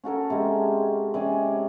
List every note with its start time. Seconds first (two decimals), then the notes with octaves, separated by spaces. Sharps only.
0.04 C#4 F#4 A4 A#4
0.30 C3 G#3 C#4
1.14 C3 C#4 D5 G#5